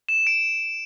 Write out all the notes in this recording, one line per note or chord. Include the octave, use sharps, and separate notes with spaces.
E7
D7